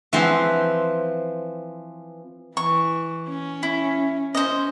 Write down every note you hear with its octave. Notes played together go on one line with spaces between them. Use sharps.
E3 F3 C4 C5
E3 C#6
C#4
E4
C#4 C5 D#5